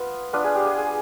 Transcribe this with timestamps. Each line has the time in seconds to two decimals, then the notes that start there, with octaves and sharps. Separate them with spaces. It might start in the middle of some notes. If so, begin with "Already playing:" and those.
Already playing: B3 F4 B4
0.33 B3 D4 F4 B4
0.44 G#4
0.55 G4
0.66 G#4
0.78 G#4